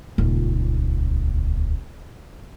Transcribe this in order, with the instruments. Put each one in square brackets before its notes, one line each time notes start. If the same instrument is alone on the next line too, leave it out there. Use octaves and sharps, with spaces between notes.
[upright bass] D#1 C#2